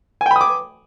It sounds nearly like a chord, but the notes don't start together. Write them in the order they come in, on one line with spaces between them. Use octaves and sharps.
G#5 G5 B5 D#6 D6